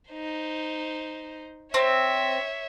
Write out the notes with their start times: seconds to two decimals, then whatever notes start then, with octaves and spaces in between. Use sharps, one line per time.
0.11 D#4 C5
1.74 C4 C#5 E5